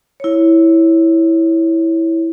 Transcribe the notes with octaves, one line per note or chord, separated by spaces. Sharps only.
E4 C#5